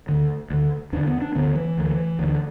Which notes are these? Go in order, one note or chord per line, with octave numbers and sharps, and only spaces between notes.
D2 D3
D2 D3
E2 D3 D4
B3
D4
D2 D3 B3
E3
D2 D3
D2 D3